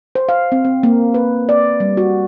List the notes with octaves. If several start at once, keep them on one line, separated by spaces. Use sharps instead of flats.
C5
F5
C4
C4
A#3
B4
D5
G3
F#4